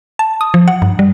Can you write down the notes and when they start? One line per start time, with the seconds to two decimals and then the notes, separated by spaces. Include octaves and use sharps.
0.19 A5
0.41 D#6
0.54 F3
0.68 F#5
0.82 G2
0.99 G3